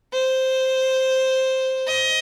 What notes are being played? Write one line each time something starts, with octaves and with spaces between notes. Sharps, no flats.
C5
D#5